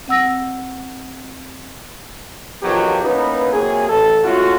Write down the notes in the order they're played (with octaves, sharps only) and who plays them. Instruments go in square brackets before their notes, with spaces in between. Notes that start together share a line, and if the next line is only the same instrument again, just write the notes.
[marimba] C4 F#5 E6 A#6
[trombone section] F2 D#3 F3 F#3 B3 G4
A#3 B3 C#4 D#4 E4 B4
C3 F#3 A#3 G#4
A1 A4
G#3 A3 C#4 F4 F#4